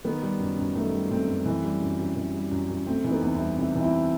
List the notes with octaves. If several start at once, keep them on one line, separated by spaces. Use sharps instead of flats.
D#3 B3
G3
F#2
F#2
D#3 A3
G3
F#2 A3 C4
F#2
E3
G3
F#2
F#2
E3
G3
F#2
F#2
C3 A3 C4
E3
B3 D#4
E2
C4 E4
G3
C3 E4 G4
E3
C4 E4